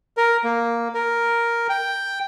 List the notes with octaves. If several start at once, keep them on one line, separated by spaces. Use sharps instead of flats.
A#4
A#3
A#4
G5